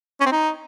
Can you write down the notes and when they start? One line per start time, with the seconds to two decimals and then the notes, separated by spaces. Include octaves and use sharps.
0.21 C#4
0.26 C4
0.32 D#4